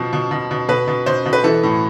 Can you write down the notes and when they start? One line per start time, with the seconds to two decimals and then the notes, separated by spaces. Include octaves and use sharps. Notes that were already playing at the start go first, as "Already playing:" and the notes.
Already playing: B2 F3
0.13 B2
0.31 B2
0.51 B2
0.68 B2 B4
0.87 B2
1.06 B2 C5
1.26 B2
1.33 B4
1.44 E3 A4
1.63 A2